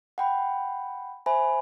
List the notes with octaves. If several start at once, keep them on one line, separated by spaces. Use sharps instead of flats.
F#5 G5 B5
C5 E5 G#5 B5